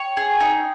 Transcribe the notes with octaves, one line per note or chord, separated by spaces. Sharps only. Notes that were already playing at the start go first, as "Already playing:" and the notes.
Already playing: C#5 G5
G#4
D#4